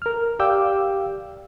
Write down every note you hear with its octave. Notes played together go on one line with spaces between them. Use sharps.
A#4 F6
G4 D5 F5 G5 D6 E6